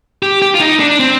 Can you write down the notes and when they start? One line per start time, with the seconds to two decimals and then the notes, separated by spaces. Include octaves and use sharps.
0.23 G4
0.42 G4
0.55 F4
0.60 D#4
0.80 D4
1.00 C4